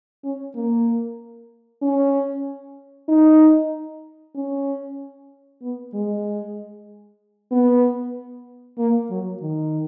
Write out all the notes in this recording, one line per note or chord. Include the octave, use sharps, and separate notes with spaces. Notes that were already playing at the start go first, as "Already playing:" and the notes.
C#4
A#3
C#4
D#4
C#4
B3
G#3
B3
A#3
F#3
D#3